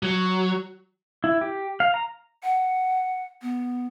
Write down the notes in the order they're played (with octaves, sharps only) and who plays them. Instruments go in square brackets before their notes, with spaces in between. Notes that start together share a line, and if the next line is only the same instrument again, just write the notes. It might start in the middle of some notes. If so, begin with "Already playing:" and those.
[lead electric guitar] F#3
[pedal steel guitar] E4
G4
F5
A#5
[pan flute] F#5
B3